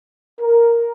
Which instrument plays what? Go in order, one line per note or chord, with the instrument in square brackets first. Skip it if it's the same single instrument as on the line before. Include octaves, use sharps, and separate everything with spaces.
[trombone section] A#4